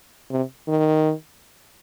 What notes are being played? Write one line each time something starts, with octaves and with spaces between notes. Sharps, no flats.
C3
D#3